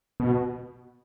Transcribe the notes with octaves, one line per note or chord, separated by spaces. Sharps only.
B2